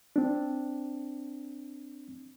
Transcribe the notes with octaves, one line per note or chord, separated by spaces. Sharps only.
C4 D4